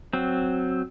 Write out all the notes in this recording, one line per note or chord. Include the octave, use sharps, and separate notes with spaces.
F#3 C4